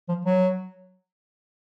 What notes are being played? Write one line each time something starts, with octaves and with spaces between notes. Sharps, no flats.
F3
F#3